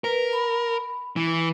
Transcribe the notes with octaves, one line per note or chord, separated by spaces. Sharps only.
A#4 B4
B5
E3